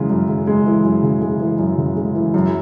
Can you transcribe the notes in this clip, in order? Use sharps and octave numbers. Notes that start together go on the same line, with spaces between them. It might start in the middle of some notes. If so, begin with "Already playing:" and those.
Already playing: F#2 C#3 E3 G#3
F#2
C#3
G#3
E3
F#2
C#3
G#3
E3
F#2
C#3
G#3
E3
F#2